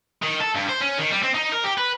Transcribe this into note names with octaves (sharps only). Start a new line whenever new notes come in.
D#3
A4
G2
C5
C#4
D#3
G3
C4
D#4
A#4
G4
B4